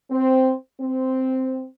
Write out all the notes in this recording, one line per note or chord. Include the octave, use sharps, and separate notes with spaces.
C4
C4